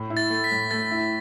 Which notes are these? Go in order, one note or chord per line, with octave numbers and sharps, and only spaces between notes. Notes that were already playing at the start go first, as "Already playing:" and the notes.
Already playing: A2
E4
A6
A3
B6
A2
A3 A6
E4